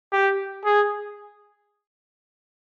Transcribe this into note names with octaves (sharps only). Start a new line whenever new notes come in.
G4
G#4